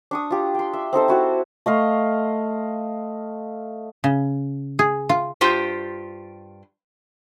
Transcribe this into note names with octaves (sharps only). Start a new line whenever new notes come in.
D4 C#6 D#6
F4 G4
G5 C6
E5
C4 D#4 A4 C5
E4 F#4 A4
A3 D#5 F5 C6
C#3
G#4
F4
G2 F4 G4 C5 G5